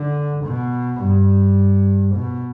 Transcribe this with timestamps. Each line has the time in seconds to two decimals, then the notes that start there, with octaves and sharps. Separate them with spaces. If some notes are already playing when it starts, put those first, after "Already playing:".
Already playing: D3
0.45 B2
1.01 G2
2.15 B2